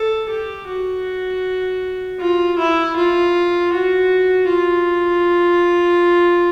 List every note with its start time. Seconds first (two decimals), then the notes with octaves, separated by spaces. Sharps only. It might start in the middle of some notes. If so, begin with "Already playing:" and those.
Already playing: A4
0.30 G4
0.67 F#4
2.19 F4
2.58 E4
2.96 F4
3.72 F#4
4.47 F4